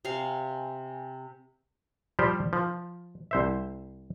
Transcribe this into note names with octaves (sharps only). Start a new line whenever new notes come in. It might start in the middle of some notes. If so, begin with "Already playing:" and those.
C3 F5 G5 G#5 C6
F3 G3 F4 G4 C5
F3
C2 C5 E5